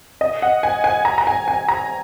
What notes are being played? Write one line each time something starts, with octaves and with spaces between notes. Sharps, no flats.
D#5
F#5
G#5
G#5
A#5
A#5
G#5
G#5
A#5